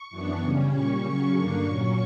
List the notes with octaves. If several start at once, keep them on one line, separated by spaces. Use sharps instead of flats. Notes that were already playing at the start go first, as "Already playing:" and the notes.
Already playing: C#6
F#2 E3 B3 D4
C#3 G3 C#4
A#2 G3 C#4 C#6
C#3 F#3 C#4 C#6
G2 D3 A#3 D4
A#2 F#3 C#4